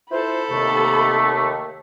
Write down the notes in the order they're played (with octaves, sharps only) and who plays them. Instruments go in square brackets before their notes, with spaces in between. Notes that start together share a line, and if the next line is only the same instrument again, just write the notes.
[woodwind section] E4 F4 C5 [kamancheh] A4 B5
[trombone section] D#2 [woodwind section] C3 [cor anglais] A3